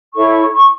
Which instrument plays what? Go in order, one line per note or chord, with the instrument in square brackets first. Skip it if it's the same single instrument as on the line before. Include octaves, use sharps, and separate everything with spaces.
[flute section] E4 A4 C#5 C#6
C#6